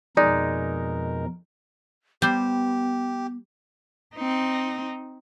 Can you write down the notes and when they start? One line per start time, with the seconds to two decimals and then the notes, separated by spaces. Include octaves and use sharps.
0.17 F2 B2 G#3 D#4 A#4 D5
2.22 G3 B3 G4 C5
4.15 C4 D#4